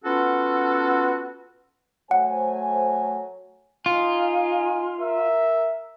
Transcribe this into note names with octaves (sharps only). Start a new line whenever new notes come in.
B3 C#4 F4 F#4 A4
F#3 A3 C5 F#5 G#5
D#4 F4 G#5
A#4 E5